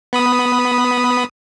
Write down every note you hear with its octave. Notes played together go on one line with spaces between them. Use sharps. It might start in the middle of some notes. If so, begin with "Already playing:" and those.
B3 B5 D#6